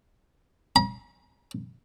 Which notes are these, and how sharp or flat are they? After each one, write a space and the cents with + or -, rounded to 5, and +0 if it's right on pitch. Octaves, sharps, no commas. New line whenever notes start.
A#5 +45